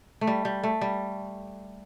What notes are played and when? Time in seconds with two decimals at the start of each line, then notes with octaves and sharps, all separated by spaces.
0.21 A3
0.27 G3
0.45 G3
0.63 A3
0.81 G3